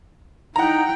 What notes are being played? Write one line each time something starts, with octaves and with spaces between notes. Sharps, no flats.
D#4 E4 F#5 G5 A#5